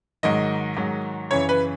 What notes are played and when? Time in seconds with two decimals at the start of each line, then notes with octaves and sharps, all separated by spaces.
0.23 G#2 D#3 F#3 D#5
0.77 G#2 D#3 F#3
1.31 F#2 C#3 E3 C#5
1.49 B4